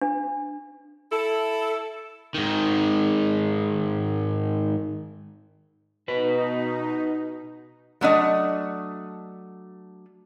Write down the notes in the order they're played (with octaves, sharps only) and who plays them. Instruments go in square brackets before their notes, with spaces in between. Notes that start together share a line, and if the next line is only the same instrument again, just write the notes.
[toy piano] D4
[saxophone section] E4 A4
[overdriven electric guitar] G#2 D#3
[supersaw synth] B2 D#4 [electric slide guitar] F#4 B4
[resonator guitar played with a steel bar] F#3 A3 D4 D#5